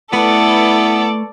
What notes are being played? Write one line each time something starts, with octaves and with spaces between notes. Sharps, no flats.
A3 B3 E4 A4 B4 D5 B5